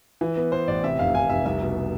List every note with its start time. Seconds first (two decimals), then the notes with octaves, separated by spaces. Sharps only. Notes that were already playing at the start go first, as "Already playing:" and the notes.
0.21 E3
0.37 B3
0.52 B3 C5
0.68 A1 D5
0.84 C3 E5
0.99 F1 F5
1.15 F1 G#5
1.30 F1 E5
1.46 C2 E5
1.61 B2